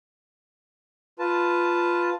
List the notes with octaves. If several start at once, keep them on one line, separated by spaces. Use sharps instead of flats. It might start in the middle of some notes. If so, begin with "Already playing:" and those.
F4 B4 A5